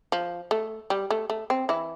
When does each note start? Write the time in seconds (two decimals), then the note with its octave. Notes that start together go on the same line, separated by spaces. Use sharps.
0.12 F3
0.51 A3
0.90 G3
1.11 A3
1.30 A3
1.50 C4
1.69 E3 E4